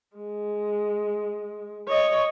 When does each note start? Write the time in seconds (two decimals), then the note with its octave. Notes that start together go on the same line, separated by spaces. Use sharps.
0.17 G#3
1.88 C#5 D#5